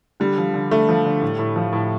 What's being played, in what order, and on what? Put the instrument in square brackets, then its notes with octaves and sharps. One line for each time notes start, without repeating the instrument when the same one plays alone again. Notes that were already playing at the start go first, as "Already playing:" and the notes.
[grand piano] D3 [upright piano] G3
[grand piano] F3
D3
[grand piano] D3 [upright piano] A3
[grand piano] F3
D3
A2
A2
F3
A2